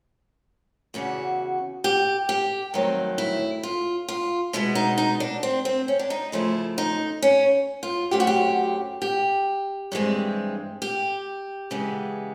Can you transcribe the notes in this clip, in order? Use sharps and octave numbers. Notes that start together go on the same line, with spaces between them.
E2 C#3 E3 F#4
G4
G4
G2 D#3 F#3 A3 C4
E4
F4
F4
B2 G#3 B3 E4
D#4
D#4
D4
C4
C4
C#4
D4
D#4
C#3 F3 A3 E4
D#4
C#4
F4
F#2 C#3 F#3 A3 C4 G4
F#4
G4
G4
G2 E3 G#3 C4
G4
C#3 E3 G#3 B3